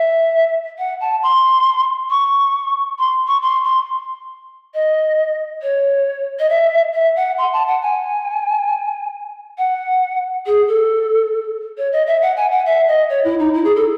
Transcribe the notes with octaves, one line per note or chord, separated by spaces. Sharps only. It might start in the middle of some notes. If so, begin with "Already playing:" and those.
Already playing: E5
F#5
A5
C6
C#6
C6
C#6
C6
C6
D#5
C#5
D#5
E5
E5
F#5
C6
A5
F#5
G#5
F#5
G#4
A4
C#5
D#5
E5
F#5
G#5
F#5
E5
D#5
C#5
E4
D#4
E4
G#4
A4